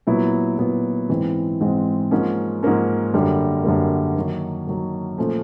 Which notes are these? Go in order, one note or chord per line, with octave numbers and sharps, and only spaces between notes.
A#2 F#3 B3 E4
A#2 F#3 B3 E4
G#2 E3 G#3 C4
G#2 E3 G#3 C4
G#2 F3 A#3 C#4
G#2 F3 A#3 C#4
F#2 D3 G3 A#3
F#2 D3 G3 A#3
D#3 F#3 A#3
D#3 F#3 A#3
A#2 F3 A3 C#4